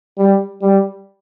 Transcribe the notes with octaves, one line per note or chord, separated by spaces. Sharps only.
G3
G3